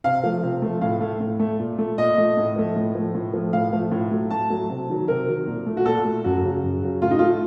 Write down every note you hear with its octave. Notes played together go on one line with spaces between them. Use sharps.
C3 F5
F3 A3
C3
F3 A3
A2 F5
A3
A2
A3
A#2
A3
A#2 D#5
A3
A2
F3 A3
A2
F3 A3
A2
F3 A3
A2 F5
F3 A3
A2
F#3 A3
A2 A5
F#3 A3
C3
D#3 F#3
C3 A#4
D#3 F#3
A#2
A3
F#4
A#2 A4
A3
F#2 F#4
C#3 F#3
F#2
C#3 F#3
A2 F4
D#4
A3 F4